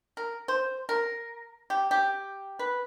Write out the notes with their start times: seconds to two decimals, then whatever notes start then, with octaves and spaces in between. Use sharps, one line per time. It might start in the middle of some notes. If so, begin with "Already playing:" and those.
0.17 A#4
0.48 C5
0.89 A#4
1.70 G4
1.91 G4
2.59 B4